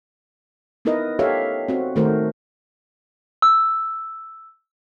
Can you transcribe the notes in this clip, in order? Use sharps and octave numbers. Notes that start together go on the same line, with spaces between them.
B3 D#4 E4 A#4 B4 D#5
G4 A4 C#5 E5 F5
C4 F#4
D#3 A3 F#4 A#4 C5
E6